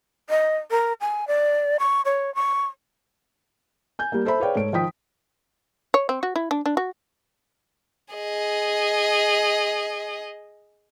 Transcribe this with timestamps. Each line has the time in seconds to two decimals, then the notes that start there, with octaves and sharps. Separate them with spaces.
0.30 D#5
0.71 A#4
1.01 G#5
1.27 D5
1.80 C#6
2.05 C#5
2.35 C#6
3.99 G#5 G6
4.12 G3 A#3
4.25 A4 C5 E5 B5
4.40 G#4 B4 C#5 D5 F5 G5
4.56 G#2 A4 C#5 D7
4.73 D#3 F3 D#4 G5 D#6 B6
5.94 C#5
6.09 C4
6.23 F#4
6.36 E4
6.51 D4
6.66 D4
6.77 F#4
8.14 G#4 D#5